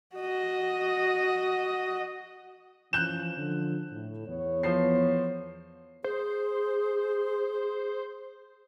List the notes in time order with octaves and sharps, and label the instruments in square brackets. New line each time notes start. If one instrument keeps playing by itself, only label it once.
[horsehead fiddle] F#4 D#5
[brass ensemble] E3 F3 C#4 [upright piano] F#6 G6 E7
[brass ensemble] D3 F3
A2
E2 B3 C#5
[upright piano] F3 C5 C7
[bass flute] G#4 [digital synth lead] C5